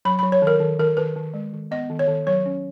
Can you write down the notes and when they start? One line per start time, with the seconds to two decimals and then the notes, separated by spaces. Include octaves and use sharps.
0.05 F#3 B5
0.19 F#3 B5
0.32 C#5
0.42 D#3 A#4
0.60 D#3
0.79 D#3 A#4
0.97 D#3 B4
1.16 D#3
1.34 G#3
1.53 D#3
1.71 B3 D#5
1.90 D#3
1.99 C#5
2.08 D#3
2.27 F#3 C#5
2.46 C#4